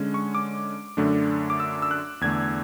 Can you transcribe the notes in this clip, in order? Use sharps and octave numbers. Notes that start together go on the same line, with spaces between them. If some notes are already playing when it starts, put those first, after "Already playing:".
Already playing: D3 G#3 C#4
C#6
D6
F#2 D3 A3 D4
D6
E6
E6
F#6
E2 D3 A3 G#6